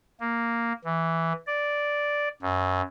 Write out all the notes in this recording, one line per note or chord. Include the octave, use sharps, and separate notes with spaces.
A#3
E3
D5
F#2